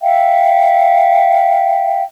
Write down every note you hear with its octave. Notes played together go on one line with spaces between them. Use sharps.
E5 F5 G5